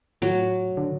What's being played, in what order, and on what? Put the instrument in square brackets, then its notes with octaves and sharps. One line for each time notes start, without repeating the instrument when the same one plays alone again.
[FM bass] A2 [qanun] F#3
[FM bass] D3